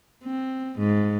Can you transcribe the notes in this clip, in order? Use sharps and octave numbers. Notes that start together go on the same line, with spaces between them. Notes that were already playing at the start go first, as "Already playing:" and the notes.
C4
G#2